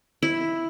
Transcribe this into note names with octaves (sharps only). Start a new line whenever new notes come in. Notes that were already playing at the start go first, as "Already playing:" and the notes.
E4